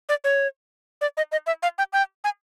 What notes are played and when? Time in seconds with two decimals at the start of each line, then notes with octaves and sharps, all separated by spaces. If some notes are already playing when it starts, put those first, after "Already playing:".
0.09 D5
0.24 C#5
1.01 D5
1.17 D#5
1.32 D#5
1.47 E5
1.63 F5
1.78 G5
1.93 G5
2.24 G#5